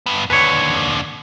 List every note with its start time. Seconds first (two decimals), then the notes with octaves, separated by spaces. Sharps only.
0.06 G2 B3
0.30 D#2 D3 B4 C#5